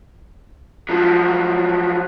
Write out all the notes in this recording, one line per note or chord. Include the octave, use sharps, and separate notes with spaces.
F3 F#3